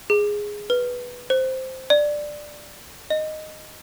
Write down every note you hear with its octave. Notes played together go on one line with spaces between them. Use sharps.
G#4
B4
C5
D5
D#5